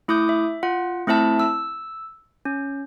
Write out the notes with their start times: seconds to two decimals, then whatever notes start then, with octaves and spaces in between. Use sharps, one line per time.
0.08 A3 E4 D6 D#6 G6
0.29 E5
0.63 F4 F#5
1.07 A3 C4 E4 E5 A5
1.40 E6
2.45 C#4